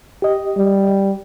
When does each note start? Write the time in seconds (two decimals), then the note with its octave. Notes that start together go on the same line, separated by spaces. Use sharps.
0.22 G4 D#5
0.57 G3